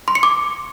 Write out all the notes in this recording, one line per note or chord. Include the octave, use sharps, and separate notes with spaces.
C6
C#7
D6